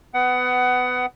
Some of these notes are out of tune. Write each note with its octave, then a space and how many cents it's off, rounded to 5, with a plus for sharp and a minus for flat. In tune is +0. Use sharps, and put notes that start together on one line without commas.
B3 +20 F#5 +20